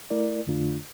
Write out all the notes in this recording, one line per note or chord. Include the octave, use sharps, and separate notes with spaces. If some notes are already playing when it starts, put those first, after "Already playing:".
A3 E4 A#4 D5
F2 D3 A3 D4 F4